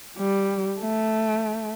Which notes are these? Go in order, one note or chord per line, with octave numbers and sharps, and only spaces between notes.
G3
A3